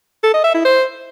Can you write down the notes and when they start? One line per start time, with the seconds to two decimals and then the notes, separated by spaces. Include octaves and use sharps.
0.23 A4
0.34 D#5
0.44 E5
0.54 E4
0.65 C5